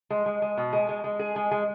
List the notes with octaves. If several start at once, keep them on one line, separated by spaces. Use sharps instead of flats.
G#3
G#3
G#3
B2
G#3
G#3
G#3
G#4
G#3
G#3